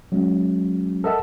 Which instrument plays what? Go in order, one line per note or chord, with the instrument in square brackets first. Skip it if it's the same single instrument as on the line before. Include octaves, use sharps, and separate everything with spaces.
[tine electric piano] F#3 G#3 C#4
A4 A#4 D#5 E5 F#5 A5